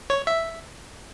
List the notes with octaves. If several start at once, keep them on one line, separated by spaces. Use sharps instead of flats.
C#5
E5